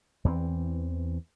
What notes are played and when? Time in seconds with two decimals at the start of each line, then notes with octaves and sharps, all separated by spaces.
0.25 E2 E3 F#3 C4